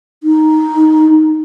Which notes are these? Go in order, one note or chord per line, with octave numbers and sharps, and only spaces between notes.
D#4